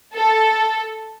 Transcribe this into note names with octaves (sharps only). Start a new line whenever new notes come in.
A4